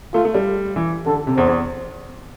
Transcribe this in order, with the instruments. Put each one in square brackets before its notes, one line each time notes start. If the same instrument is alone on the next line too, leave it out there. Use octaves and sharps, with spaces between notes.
[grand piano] A3 [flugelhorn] F4
[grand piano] A3
G3
E3
[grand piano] D3 [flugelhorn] A4
[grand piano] C3
[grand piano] E2 [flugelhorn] C5
[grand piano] E2